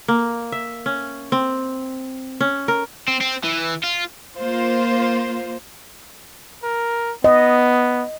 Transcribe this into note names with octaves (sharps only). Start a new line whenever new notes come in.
A#3
E5
C#4
C4
C#4
A#4
C4
C4
E3
F4
A#3 F4 C5
A#4
B3 D#5